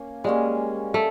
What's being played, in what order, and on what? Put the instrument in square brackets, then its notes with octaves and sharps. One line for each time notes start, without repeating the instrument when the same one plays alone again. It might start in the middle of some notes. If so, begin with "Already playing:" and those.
Already playing: [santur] A#3 C#4
[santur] G3 A#3 C#4 [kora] G#3
[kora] A3